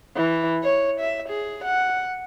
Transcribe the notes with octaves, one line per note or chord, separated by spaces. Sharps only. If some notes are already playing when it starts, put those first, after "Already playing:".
E3
C#5
E5
G#4
F#5